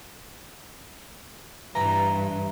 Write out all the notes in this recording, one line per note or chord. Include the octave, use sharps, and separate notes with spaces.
G2 E3 A#5